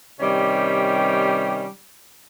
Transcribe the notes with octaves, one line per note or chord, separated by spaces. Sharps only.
C3 D#3 G3 C#4 G4